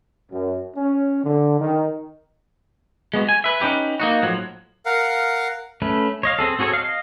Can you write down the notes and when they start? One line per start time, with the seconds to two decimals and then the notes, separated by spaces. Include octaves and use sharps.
0.31 F#2
0.76 C#4
1.24 D3
1.60 D#3
3.14 G#3 B3 F#4
3.29 G#5
3.44 B4 E5
3.60 C#4 D#4 G4 B4
4.00 A#3 D#4 F#4
4.22 A2 F3 F#3
4.86 A#4 F5 F#5
5.82 A3 C#4 B4
6.23 C#5 D#5 F5
6.39 C4 G#4 A4
6.59 C4 F#4 G#4 A4 C#5
6.73 D#5 F5